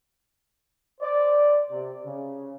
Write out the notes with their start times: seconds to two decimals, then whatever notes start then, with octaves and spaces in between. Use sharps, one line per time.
1.00 C5 D5
1.70 C3
2.05 C#3